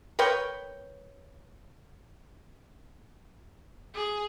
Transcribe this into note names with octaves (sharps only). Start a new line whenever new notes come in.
A#4 B4 C#5 G5
G#4